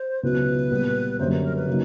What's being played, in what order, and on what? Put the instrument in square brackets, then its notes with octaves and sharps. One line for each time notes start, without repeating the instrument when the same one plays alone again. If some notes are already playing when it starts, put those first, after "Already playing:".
Already playing: [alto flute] C5
[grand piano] C#2 B2 F#3 B3 E4 [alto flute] B4
[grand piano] A#2 G3 B3
[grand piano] F#2 D3 G3 A#3 [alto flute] C5
[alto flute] B4
A#4
B4
[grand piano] C#3 F#3 A#3 D#4